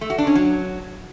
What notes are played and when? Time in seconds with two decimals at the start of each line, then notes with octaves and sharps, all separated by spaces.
0.01 A3
0.10 F#4
0.18 D4
0.27 C#4
0.35 F#3